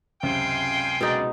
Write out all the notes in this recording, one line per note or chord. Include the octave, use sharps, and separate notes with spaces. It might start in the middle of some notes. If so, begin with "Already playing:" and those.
C#2 F#2 C3 F5 G5 G#5 C6
B2 G#3 D#4 G#4 D5